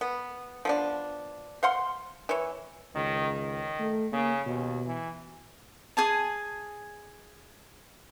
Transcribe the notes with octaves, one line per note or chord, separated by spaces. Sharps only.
B3
F3 B3 D4
C5 F5 F#5 C6
E3 C#5
C#2 D#3
D#3
A3
C#3 A#3
D#2 B2
E3
G#4 G#5 A5